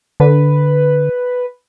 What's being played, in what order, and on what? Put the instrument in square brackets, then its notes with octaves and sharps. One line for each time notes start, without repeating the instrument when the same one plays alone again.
[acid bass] D3 [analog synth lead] B4